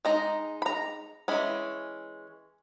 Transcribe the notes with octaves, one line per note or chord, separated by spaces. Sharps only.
G#3 D#4 A#5
B5
A#5
E3 G#3 C#4 B5